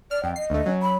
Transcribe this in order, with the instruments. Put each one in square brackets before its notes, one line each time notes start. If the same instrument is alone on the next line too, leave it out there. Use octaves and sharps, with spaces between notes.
[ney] D5 [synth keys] F6
[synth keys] F2 [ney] G5
[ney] D#5 [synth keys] C7
[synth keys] D2 A3
F#3 C#4
[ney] B5